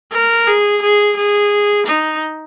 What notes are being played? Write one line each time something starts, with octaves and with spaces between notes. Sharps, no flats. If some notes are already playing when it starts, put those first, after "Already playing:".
A#4
G#4
G#4
G#4
D#4